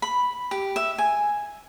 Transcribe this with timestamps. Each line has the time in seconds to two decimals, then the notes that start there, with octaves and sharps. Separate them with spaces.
0.02 B5
0.51 G4
0.76 E5
0.98 G#5